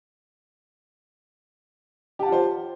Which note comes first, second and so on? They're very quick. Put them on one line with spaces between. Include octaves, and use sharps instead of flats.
G4 A5 F#5 F4 C5